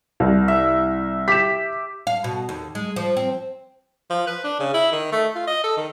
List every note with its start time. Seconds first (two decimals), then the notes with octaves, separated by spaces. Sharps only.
0.20 C2
0.48 E5
1.28 G4 B6 E7
2.07 F5
2.24 B2
2.49 D#2
2.75 G#3
2.96 F3
3.17 C4
4.10 F3
4.27 B4
4.44 D4
4.60 C#3
4.74 E4
4.92 D#3
5.12 A3
5.35 F4
5.47 D#5
5.64 A4
5.77 D#3